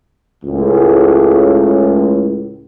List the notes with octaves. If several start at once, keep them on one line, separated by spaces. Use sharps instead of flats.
C#2 A2